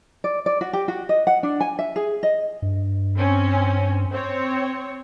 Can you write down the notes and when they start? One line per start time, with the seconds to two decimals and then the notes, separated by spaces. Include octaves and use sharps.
0.24 D5
0.46 D5
0.61 F#4
0.73 G4
0.88 F#4
1.09 D#5
1.27 F#5
1.43 D4
1.61 G#5
1.79 E5
1.96 G#4
2.23 D#5
2.62 G2
3.16 C4 C#4
4.12 C4 C#5